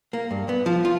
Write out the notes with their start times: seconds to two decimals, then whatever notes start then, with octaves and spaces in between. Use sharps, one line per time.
0.13 A#3
0.31 G2
0.49 B3
0.66 F3
0.85 F4